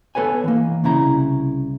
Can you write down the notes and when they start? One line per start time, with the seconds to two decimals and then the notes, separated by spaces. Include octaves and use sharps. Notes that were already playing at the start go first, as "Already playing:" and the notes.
0.15 B3 A4 B4 C#5 G#5
0.44 E3 A#3
0.84 C2 C#3 E4 A#5